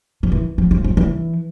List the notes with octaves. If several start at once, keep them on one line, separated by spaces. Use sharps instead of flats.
F3
E3
F3
F3
F3
E3